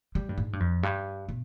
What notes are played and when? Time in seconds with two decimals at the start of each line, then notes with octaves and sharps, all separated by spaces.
0.15 G3
0.29 G2
0.38 G#2
0.53 G2
0.60 F2
0.83 G2
1.29 B2